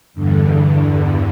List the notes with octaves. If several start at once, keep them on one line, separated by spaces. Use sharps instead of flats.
E2 G2 D3